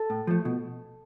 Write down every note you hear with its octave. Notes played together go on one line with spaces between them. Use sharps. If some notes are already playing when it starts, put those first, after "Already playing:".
Already playing: A4
A2
F3 A3
B2